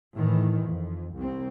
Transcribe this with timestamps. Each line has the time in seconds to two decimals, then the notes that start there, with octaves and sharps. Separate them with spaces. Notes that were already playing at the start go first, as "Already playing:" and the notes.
0.16 A2 D#3 E3
0.66 F2
1.16 C2 C4